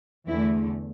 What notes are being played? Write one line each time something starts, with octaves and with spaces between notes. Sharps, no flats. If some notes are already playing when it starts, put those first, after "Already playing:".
E2 D3 E3 A3 E4